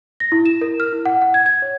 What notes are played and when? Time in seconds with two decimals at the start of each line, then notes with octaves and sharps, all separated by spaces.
0.20 A#6
0.32 E4
0.46 E7
0.61 A#4
0.80 F6
0.93 E4
1.06 F#5
1.22 F#5
1.34 G#6
1.46 G#6
1.62 C#5